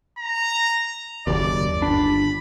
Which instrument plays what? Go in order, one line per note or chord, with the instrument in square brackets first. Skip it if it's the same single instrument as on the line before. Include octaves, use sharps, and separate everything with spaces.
[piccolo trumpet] A#5
[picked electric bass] F#1 D#2 [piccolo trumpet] D5
[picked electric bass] G1 D4 [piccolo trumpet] B5